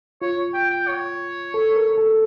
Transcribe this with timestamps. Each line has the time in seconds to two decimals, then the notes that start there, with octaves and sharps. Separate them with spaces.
0.22 F4 C#5
0.54 G5
0.71 G5
0.88 C#5
1.54 A4
1.76 A#4
1.98 A4